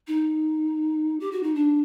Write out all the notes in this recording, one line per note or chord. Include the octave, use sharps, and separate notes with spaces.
D#4
G4
F#4
D#4
D4